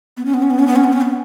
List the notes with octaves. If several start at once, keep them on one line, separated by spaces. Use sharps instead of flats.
B3
C#4
B3
C#4
B3
C#4
B3
C#4
B3
C#4
B3